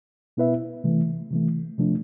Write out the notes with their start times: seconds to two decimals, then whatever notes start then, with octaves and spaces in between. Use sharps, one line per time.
0.37 B2 B3 E4 B4 E5
0.84 C3 E3 A3
1.31 C3 E3 A3
1.78 C3 F3 A3 D4